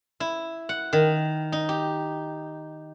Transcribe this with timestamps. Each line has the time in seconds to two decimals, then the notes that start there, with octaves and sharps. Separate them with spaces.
0.20 E4
0.69 F#5
0.93 D#3
1.52 D#4
1.69 G4